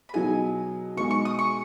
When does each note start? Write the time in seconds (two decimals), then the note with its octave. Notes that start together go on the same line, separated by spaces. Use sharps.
0.09 B5
0.14 B2 F#3 D#4 G#4 G#5
0.96 B2 G#3 D#4 G#4 C#6
1.11 C#6
1.25 D#6
1.39 C#6